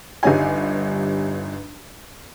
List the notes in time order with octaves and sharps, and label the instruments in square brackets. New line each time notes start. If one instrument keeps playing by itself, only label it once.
[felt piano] G1 G2 G3 D#4 C#5 G#5